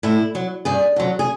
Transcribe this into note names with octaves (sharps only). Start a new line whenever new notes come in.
A2 E4
F#3
G2 G#4
D3 F#3
G#4